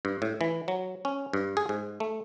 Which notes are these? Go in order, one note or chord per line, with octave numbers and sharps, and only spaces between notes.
G2
A2
E3
F#3
C#4
G2
G#4
G#2
A3